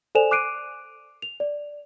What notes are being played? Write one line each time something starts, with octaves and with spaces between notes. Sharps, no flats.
A4 C5 D5 G#5 E7 F7
D6 F#6 C7 D7 D#7
F7
D5